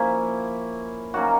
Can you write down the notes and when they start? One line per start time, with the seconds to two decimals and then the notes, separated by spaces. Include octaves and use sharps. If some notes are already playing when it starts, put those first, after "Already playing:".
Already playing: F3 A#3 C#4 E4
1.14 D#3 F#3 A#3 C#4 F#4